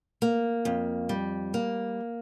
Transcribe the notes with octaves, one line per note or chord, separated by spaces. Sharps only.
A#3
F2
G3
A#3